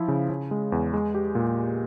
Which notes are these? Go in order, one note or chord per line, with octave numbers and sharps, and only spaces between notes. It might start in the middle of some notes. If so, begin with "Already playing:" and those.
Already playing: F3 E4
C#3
C#3
G#3
E2
G#3
G4
A#2